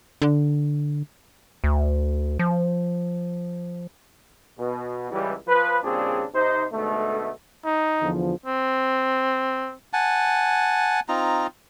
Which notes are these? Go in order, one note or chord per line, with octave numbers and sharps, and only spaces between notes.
D3
D2
F3
B2
C#2 E3 G3
F3 B4
A#2 C#3 G3 C4 D4 G#4
C3 D#4 C5
G#2 B2 D3 A3
D#4
E2 D3 F3
C4
F#5 G#5 A5
C4 D#4 F4 A#5